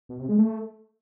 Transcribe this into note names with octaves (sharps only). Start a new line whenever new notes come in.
B2
C3
G#3
A3